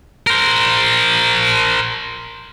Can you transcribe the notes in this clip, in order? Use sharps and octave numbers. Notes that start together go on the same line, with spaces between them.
A#4 C5